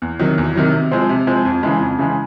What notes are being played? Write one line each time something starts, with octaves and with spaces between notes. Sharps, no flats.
E2
C3 D#3 F#3
E2
C3 D#3 F#3
C3
F3 G#3 C4
C3
F3 G#3 C4
F2
C#3 E3 G#3
F2
C#3 E3 G#3